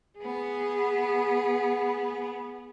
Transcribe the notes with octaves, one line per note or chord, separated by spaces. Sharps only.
B3 G#4